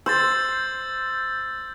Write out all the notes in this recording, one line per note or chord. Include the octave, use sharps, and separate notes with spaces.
C5 E6 G6 A6